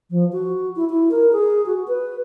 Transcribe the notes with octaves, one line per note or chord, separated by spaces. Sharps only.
F3
F#4
E4
E4
A#4
G#4
F#4
B4